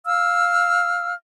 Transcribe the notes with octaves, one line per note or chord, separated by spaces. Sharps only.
F5 E6 F6